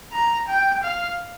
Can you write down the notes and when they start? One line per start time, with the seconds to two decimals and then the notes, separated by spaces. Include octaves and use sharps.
0.12 A#5
0.48 G5
0.83 F5